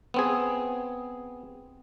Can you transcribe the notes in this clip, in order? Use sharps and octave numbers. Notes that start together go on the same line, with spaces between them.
B3 C4 G#4